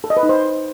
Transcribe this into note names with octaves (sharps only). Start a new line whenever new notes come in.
A4
D#5
B4
D#4
C5